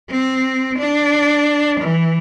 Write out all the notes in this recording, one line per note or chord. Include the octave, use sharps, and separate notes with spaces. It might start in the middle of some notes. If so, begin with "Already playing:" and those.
C4
D4
E3